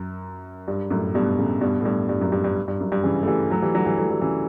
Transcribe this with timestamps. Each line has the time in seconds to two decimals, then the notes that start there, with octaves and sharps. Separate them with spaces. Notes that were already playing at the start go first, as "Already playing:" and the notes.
Already playing: F#2
0.68 G2
0.90 F#2 A2
1.14 G2 B2
1.39 A2 C#3
1.61 G2 B2
1.81 A2
1.85 G2
2.09 G2
2.21 F#2
2.32 G2
2.44 G2
2.68 G2
2.80 F#2
2.92 G2
3.04 C#3 E3
3.23 A3
3.27 E3 G3
3.50 F#3 A3
3.62 E3 G3
3.74 D3 F#3
3.86 E3 G3
3.98 F#3 A3
4.10 E3 G3
4.21 C#3 E3